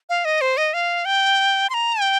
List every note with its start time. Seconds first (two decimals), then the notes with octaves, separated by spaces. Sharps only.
0.09 F5
0.25 D#5
0.41 C5
0.57 D#5
0.74 F5
1.05 G5
1.70 C6
1.74 A#5
2.01 G5